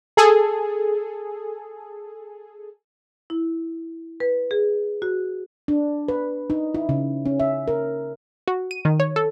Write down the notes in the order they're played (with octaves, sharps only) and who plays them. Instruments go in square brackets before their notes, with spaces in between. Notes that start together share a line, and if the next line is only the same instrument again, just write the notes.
[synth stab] G#4 A4
[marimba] E4
B4
G#4
F#4
[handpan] D4
B4
D#4
E4
C#3
C#4
E5
A#4
[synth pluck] F#4
D#7
D#3
C#5
A4